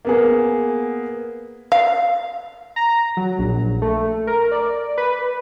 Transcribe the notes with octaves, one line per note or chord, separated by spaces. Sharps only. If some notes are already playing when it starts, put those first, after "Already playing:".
A#3 B3 G#4
F5
A#5
F#3
A#1
A3
A#4
D5
B4